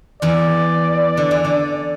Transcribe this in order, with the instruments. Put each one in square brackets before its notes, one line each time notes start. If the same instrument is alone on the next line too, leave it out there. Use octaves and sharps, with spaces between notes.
[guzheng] E2 E3 [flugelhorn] D5
[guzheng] D3
E3
D3